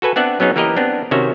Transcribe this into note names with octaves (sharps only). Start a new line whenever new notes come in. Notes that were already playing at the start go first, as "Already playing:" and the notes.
F#4 A4 B4 G#5
B3 C4 D4 D5 E5 F#5
F#3 B3 C#4 D#4 G#4
E3 A#3 G4 A#4 B4 D#5
B3 C4 D4
C3 D#3 C#4 F#4 E5